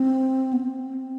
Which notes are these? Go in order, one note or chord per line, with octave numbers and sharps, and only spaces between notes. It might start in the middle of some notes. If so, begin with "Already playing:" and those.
Already playing: C4
B3
C4